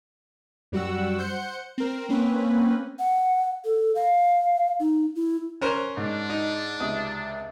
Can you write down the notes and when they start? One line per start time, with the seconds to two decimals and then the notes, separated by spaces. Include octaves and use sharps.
0.72 F#2 G3 F#4 F#5 E6
1.18 C5 F#5 G6 C#7
1.78 C4 A#4
2.09 A#3 C4 C#4 B4
2.99 F#5
3.65 A4
3.95 F5
4.80 D#4
5.16 E4
5.61 C#4 A#4 C5 F#6
5.97 G#2 D4
6.30 D#4
6.80 C#2 C3 D#6